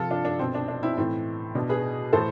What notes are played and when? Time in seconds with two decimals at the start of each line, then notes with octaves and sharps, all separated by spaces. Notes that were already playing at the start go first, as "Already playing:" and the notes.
Already playing: C3 F3 F4 A4
0.10 D4 F4
0.25 D4
0.39 B2 C4
0.55 D4
0.68 D4
0.83 C4 E4
0.97 A2 E3 C4
1.55 B2 D4
1.69 G#4 B4
2.13 A2 E3 A4 C5